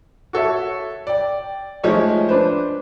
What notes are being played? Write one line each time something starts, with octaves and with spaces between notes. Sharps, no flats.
F#4 A4 C#5 E5
D5 G5
F3 G#3 A3 D#4 C#5
D4 B4 C5